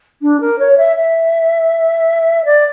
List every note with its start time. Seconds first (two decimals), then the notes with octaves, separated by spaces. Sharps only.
0.22 D4
0.40 A#4
0.59 C#5
0.77 E5
0.96 E5
2.45 D5